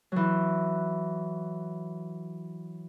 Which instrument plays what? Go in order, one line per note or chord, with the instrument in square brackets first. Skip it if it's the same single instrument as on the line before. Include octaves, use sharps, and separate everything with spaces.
[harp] E3 F#3